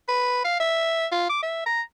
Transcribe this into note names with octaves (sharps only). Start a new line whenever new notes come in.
B4
F5
E5
F4
D6
E5
A#5